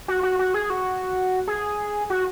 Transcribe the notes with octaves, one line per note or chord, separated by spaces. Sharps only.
F#4
F#4
F#4
G#4
F#4
G#4
F#4